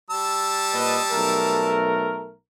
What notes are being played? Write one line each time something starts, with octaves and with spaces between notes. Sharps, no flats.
G3 A5 E6
A#2 B4 D#5
B1 A3 A#4